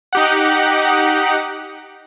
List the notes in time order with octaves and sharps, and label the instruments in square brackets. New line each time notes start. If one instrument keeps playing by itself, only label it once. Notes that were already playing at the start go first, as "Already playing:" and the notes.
[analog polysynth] D#4 G4 F#5